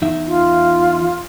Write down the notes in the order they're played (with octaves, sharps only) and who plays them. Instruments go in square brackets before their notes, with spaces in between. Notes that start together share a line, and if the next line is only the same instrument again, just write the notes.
[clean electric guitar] E2 D#4 E5
[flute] F4